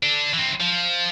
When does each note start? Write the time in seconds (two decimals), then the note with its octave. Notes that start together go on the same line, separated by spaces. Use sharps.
0.03 D4 A4
0.33 E3 C4
0.60 F3